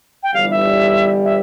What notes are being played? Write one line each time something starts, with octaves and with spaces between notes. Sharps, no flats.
G5
G1 G2 E3 G3 F5
E5
E5